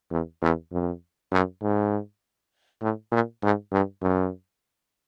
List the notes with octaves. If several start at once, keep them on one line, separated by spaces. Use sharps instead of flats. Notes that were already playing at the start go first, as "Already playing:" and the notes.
E2
E2
F2
F#2
G#2
A2
A#2
G#2
G2
F#2